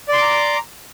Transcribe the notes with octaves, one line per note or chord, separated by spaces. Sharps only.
D5 A#5 C6 D6